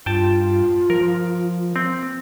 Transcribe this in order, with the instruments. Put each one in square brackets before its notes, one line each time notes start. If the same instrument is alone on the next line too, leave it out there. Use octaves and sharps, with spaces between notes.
[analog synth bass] G2 [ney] F4 [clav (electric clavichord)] G5 A5
[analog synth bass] F3 [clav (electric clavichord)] A#4
[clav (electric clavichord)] C4